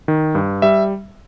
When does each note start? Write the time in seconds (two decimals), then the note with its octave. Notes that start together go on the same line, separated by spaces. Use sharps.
0.08 D#3
0.35 G2
0.62 G3 E5